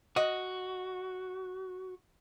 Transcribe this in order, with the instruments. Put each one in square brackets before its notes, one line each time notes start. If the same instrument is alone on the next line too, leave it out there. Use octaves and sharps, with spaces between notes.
[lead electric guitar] F#4 [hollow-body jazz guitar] D#5 F#5